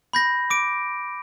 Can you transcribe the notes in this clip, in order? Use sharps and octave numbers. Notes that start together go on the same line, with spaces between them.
B5 G6 A#6
D6 D7